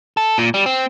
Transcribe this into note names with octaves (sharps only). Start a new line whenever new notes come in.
A4
A#2
G3
C4